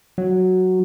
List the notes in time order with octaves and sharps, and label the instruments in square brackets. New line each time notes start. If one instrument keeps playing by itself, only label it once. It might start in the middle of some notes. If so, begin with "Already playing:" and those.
[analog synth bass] F#3